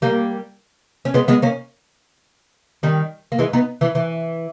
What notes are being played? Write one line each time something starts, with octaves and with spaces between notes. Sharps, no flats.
G3 A#3
C#4
G#3 B3
G#3 B3
A#3 C#4
D#3 G3
A#3
E3 G#3
B3 D#4
E3
E3